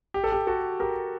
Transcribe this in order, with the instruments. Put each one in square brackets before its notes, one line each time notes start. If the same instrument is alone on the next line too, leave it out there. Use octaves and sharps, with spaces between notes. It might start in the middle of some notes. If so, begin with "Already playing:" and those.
[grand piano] G4
A4
G4
F#4 A4
G4 A#4